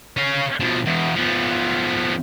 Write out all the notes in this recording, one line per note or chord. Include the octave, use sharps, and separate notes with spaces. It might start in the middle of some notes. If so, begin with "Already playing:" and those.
C#4 F5
B2 F3
E2 B2
F3 B3